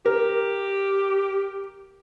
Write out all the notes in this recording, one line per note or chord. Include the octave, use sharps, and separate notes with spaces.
G4 A#4